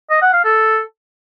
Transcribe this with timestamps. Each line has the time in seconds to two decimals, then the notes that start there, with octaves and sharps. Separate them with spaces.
0.10 D#5
0.22 F#5
0.33 F5
0.44 A4